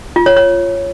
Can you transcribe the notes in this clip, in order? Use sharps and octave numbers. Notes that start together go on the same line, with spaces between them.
F4
C#5
C#5